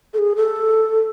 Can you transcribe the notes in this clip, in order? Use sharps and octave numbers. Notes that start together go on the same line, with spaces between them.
A4
G#4
A4